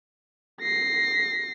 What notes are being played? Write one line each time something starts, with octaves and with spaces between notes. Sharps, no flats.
A#6 C7